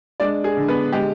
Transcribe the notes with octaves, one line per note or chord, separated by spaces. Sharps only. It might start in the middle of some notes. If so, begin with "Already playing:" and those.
G#3 D4 D5
G#4
D3
B3 B4
G#3 G4